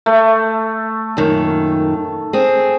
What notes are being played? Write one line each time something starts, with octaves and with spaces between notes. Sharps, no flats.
A3
F#2 A#2 D#3
C4 G#4